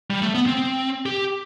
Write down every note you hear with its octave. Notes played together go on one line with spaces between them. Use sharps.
G3
A3
B3
C4
G4